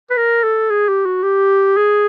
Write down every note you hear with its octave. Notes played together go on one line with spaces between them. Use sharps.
B4
A#4
A4
G#4
G4
F#4
G4
G#4